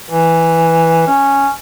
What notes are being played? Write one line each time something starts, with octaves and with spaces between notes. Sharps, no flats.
E3
C#4